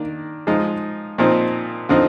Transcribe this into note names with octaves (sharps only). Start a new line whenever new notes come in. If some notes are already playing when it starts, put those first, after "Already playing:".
Already playing: D#3 A#3 D4
F3 G#3 D#4
A#2 F3 C4 D#4
D3 F3 C4 D#4